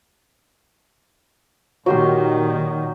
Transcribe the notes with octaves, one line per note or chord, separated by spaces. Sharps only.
A#2 D#3 F#3 G4 C6